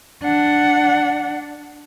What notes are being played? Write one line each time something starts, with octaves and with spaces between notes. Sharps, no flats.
D4 F#5